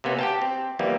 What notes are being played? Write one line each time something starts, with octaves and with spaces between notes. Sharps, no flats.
C3 A#3 B3 C#4
G4 G5 A5
C4
E3 F3 G3 A#3 B3